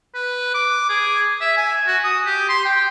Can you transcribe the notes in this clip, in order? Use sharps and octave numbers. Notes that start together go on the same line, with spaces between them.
B4
D6
G#4
E5
G#5
F#4
D#6
G4
C6
G5